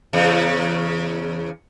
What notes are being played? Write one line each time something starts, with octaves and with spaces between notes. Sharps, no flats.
E2 C#3